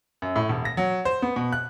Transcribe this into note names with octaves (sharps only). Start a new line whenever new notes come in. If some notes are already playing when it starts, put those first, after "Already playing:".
F#2
A2
E1
A#6
F#3
C5
B3
B2
F#6